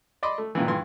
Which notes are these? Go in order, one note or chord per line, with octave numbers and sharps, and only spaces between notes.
D5 D#5 B5 C6 D6
A3
G2 A#2 D#3 E3
G2 E3 C6